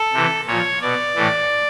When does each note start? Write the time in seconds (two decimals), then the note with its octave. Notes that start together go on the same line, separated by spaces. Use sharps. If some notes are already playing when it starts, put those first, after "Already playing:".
Already playing: A4
0.13 C3 E3
0.47 A#2 F3 C#5
0.81 B2 D5
1.16 A2 E3